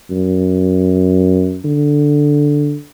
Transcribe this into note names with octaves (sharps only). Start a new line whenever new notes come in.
F#2
D3